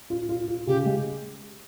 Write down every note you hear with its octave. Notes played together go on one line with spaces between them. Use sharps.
F4
F4
F4
C#3 G4
G#3